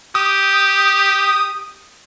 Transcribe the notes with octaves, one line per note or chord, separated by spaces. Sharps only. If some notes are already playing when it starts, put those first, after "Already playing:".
G4 D#6